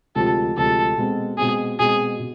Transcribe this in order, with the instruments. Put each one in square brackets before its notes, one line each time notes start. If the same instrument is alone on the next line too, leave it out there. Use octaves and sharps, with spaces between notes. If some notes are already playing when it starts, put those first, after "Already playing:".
[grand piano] D2 C3 F3 G#3 [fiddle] A4
[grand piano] D2 C3 F3 G#3 [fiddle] A4
[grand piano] B2 G#3 C4
[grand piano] B2 G#3 C4 [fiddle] G#4
[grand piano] B2 G#3 C4 [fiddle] G#4
[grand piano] B2